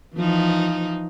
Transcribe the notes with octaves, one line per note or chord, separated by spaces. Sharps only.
E3 F3 D#4